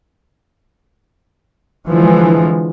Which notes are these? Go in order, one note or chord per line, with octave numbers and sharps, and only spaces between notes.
D3 E3 F3 G#3